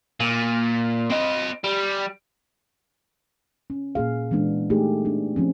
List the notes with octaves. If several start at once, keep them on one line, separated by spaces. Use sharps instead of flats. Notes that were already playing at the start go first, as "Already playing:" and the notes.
A#2
C4 D#5
G3
C#4
A#2 A#3 G#4 F5
E3 G#3 B3 D4
A3 D#4 G4 G#4
B3 D4
F3 C4 C#4